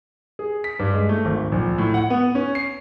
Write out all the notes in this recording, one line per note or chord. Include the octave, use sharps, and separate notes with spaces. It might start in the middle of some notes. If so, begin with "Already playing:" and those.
G#4
B6
G2
G#3
A3
G#1
A#1
A2
F#5
B3
C#4
C7